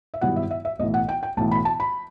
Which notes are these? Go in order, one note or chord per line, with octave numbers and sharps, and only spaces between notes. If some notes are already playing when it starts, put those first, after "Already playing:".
E5
G2 D#3 F#3 B3 E4 F#5
E5
E5
E5
B1 A2 E3 D#5
F#5
G5
G5
B1 A2 E3 A5
B5
A5
B5